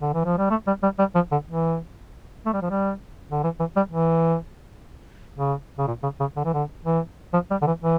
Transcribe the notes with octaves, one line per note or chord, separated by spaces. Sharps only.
D3
E3
F3
G3
A3
G3
G3
G3
F3
D3
E3
A3
G3
F3
G3
D3
E3
E3
G3
E3
C#3
C#3
A#2
C#3
C#3
D3
E3
D3
E3
F3
G3
D3
E3
E3